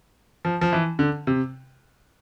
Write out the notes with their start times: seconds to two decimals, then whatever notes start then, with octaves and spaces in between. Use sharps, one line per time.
0.45 F3
0.61 F3
0.73 E3
0.99 D3
1.27 C3